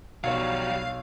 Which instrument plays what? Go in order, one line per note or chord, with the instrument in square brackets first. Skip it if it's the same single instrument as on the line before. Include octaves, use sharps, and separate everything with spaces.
[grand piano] B1 C#5 [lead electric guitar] F#3 G3 [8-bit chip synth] F5